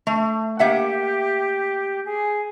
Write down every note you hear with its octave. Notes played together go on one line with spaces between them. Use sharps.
A3
A#3 G4 E5 F#5
G#4